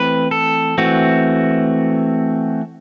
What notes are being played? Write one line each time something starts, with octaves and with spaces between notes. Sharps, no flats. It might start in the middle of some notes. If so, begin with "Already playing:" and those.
Already playing: E3 A3 C4 B4
A4
E3 A3 C4 F#4